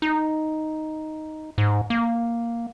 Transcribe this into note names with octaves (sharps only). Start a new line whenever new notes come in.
D#4
G#2
A#3